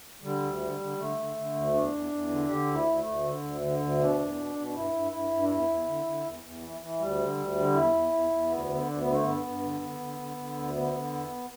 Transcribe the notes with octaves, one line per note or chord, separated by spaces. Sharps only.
D3 G3
D2
D3
D3
D3 A3
D3
D3
D2
E2 D4
E2
E2
D3
D3 G4
D2
E4
D2
A3
D2
D3
D2
D3
D2
B2 D4
E2
B2
B2
D4
G2 E4
G2
G2 E4
G2
D4
E2 E4
E2
D3
D3
E2
E2
E3
E3
D2 G3
D3
D2
D3
E2 E4
E2
E2
E2
D2 B3
D3
D2 D4
B3
D3
A3
G2 B3
G2
D3
D3
D3
D3
D3
D2
D3 B3
D3
E2